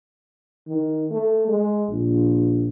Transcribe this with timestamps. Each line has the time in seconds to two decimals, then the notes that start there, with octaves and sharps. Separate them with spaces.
0.67 D#3
1.11 A3
1.48 G#3
1.90 A#1